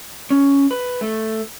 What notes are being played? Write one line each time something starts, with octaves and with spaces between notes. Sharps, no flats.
C#4
B4
A3